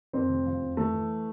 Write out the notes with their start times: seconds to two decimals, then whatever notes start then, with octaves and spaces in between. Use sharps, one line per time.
0.13 F2 C4
0.29 F1
0.46 F3
0.61 F2
0.77 E3 A3
0.94 E3